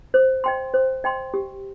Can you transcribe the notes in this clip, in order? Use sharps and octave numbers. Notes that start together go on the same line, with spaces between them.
C5
D#5 G5 C6
C5
D#5 G5 C6
G4